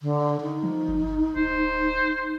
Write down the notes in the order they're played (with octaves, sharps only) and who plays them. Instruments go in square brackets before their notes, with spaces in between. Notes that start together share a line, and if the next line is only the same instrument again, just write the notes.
[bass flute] D3
D#4
[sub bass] F3
G1
[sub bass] D1 [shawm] C5